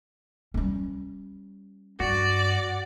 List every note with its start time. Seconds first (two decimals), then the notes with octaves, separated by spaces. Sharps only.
0.54 G3 C#4
2.00 G2 F#4 D5